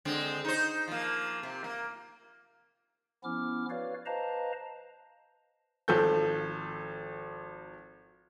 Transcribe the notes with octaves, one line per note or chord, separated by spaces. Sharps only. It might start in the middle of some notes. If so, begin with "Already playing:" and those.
D3 G#3 C4
D#4 C5
F3 A#3
C3
A#3
F3 B3 C#4 E4 D6 F6
F#4 B4 C#5 D5 F5
B4 C5 D#5 F5 A5 A#5
G#1 F3 A4 G6